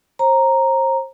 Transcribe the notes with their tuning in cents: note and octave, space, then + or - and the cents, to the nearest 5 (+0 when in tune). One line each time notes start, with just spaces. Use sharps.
C5 +35 A#5 +0